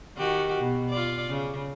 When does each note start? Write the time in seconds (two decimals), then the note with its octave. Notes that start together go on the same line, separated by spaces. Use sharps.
0.17 D#3 F#4 G4
0.59 B2
0.90 F4 D5
1.29 C#3